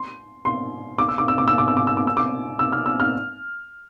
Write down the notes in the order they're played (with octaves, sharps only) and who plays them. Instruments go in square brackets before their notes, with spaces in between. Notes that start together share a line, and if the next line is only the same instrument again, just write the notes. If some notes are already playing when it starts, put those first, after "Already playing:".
Already playing: [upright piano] C6
C6
D6
E6
D6
E6
D6
E6
D6
E6
D6
E6
D6
E6
D6
E6
F6
E6
F6